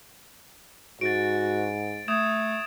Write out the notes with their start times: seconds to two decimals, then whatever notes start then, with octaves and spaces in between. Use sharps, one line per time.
1.01 G#2 F#4 A6 D7
2.08 A3 D#6 G#6 E7